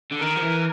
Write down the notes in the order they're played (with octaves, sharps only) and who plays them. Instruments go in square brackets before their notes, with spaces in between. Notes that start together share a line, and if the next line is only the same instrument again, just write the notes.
[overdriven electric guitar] D3
[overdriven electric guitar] D#3 [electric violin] A#4
[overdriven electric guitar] F3
E3